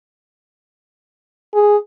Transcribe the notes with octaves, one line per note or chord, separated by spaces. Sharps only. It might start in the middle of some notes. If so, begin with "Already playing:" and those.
G#4